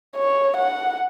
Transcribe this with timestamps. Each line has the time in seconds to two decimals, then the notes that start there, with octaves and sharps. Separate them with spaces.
0.16 C#5
0.56 F#5